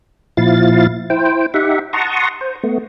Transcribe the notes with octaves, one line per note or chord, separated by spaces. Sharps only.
A#2 F3 E4 F5 A6
E4 C5 G5
D#4 G4 E5 F#5
F#5 A5 A#5 C6 C#6 D#6
C5
A3 B3